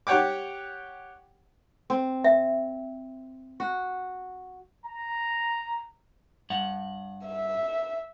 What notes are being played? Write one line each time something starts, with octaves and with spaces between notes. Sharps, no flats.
G4 C#5 F#5 G5 D6
C4
E5
F#4
A#5
G2 F#5
E5